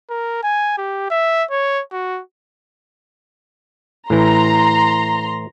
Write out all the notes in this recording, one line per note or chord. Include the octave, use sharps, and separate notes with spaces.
A#4
G#5
G4
E5
C#5
F#4
A2 E3 A#5 C6